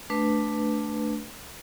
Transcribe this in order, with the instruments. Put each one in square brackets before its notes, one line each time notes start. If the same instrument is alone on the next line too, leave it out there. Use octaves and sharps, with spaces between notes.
[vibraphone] A3 D4 B4